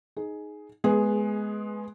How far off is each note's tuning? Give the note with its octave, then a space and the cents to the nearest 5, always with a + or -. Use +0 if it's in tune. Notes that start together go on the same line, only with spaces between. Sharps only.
D#4 +0 G#4 +10
G#3 +20 B3 +0 G#4 +0